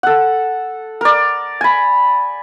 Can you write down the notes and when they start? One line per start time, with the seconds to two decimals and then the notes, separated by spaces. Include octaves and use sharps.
0.03 A4 F#5
1.01 A#4 D5
1.61 G#5 B5